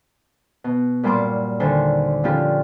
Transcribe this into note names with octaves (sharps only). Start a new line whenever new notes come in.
B2
G2 A#2 F#3 A#3 C6 D6
D#2 D3 C5 G#5
D3 F3 C#4 F4 G4